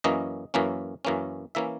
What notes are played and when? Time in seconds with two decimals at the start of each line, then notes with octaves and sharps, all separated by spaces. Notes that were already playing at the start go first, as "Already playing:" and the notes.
0.04 F#2 E3 A#3 C#4 D#5
0.54 F#2 E3 A#3 C#4
1.05 F#2 E3 A#3 C#4
1.55 E3 A#3 C#4 E5